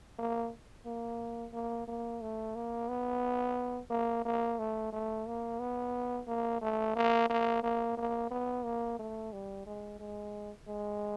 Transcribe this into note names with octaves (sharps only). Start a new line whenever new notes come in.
A#3
A#3
A#3
A#3
A3
A#3
B3
A#3
A#3
A3
A3
A#3
B3
A#3
A3
A#3
A#3
A#3
A#3
B3
A#3
A3
G3
G#3
G#3
G#3